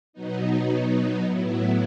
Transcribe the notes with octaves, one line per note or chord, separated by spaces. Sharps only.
B2 F#3 B3 D#4
A2 F#3 B3 E4